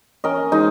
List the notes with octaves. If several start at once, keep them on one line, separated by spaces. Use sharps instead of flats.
C#4 A#4 D#5
G#3 D#4